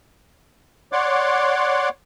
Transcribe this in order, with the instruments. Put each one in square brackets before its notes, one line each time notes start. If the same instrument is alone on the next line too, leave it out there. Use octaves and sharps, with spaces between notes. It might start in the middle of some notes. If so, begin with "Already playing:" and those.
[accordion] C#5 D5 F#5 C6 D6